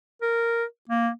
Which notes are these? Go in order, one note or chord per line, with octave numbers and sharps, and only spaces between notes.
A#4
A#3